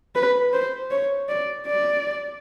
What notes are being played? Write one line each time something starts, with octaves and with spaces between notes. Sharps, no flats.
B4
C5
C#5
D5
D5